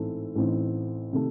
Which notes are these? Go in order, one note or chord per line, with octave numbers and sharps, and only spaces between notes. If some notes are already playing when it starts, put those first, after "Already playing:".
Already playing: A1 G#2 E3 A3 C4
A1 A2 E3 C4 D#4
C3 D#3 A3